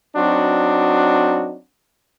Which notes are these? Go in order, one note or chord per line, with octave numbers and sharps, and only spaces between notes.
F#3 C4 D4 D#4 F#4